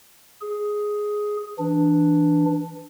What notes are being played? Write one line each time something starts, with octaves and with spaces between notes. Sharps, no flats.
G#4
E3 D4